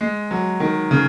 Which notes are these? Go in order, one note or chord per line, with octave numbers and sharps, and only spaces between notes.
G#3
F#3
D#3
C#3